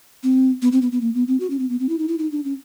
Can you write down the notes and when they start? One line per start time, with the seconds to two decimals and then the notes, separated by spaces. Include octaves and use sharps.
0.23 C4
0.62 B3
0.72 C4
0.82 B3
0.92 B3
1.01 A#3
1.14 B3
1.27 C4
1.40 F#4
1.50 C#4
1.59 C4
1.69 B3
1.80 C4
1.89 E4
1.99 D#4
2.08 E4
2.18 D#4
2.31 D4
2.44 C#4